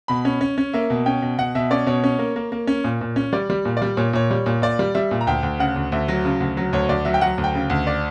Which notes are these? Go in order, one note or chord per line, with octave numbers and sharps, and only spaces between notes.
B2 B5
C#4
C#4
C#4
A#3 E5
B2
C#4 G5
B2
B2 F#5
B2 E5
C#4 D5
B2 C#5
C#4
A#3
A#3
A#3
C#4
A#2
A#2
C#4
G3 D5
G3
A#2
D5
G3
A#2 C#5
A#2 C#5
G3
A#2
A#2 D5
G3
G3 E5
A#2
A#5
D2 G5
D2
C#3 F#5
D2
D2 E5
F#3
C#3
D2
F#3
D2 C#5
D2 D5
F#3 E5
G5
F#3 F#5
D2
G5
C#3
D2
D5